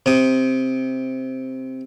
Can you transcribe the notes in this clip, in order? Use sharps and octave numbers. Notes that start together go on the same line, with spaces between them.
C3 D#6